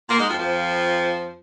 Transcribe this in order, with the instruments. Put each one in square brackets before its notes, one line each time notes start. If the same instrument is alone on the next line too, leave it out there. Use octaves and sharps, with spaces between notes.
[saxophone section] A#2 A#3
G#2 G#3
F2 F3
F2 F3